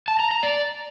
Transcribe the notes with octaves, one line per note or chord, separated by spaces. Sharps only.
A5
A#5
A#5
D5